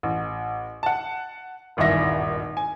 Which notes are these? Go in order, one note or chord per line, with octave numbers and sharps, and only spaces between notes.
A1
F#5 A5
D#1 G#1 G2 E3 E5 A#6
G#5